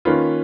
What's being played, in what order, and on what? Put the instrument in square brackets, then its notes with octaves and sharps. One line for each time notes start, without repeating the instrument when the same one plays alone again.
[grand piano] D#3 A#3 C#4 F4 B4